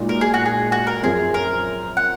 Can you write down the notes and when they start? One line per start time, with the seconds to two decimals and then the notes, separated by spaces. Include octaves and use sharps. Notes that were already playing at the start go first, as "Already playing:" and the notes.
Already playing: A#2 G#3 D#4 F#4
0.09 A#4
0.21 G#4
0.34 F#4
0.46 G#4
0.72 F#4
0.87 A#4
1.03 F#2 F3 C4 G#4
1.34 A#4
1.97 F#5